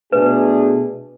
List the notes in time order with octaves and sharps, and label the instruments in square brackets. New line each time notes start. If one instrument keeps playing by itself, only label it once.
[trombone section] B2 A3 D4 G#4 [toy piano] B4